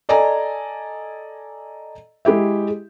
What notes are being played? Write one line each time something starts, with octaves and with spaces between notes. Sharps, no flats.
A4 D5 D#5 G#5 A#5
G#3 E4 G4 E5